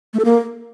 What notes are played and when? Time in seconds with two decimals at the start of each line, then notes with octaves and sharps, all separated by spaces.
0.14 A3
0.19 A4
0.25 A#3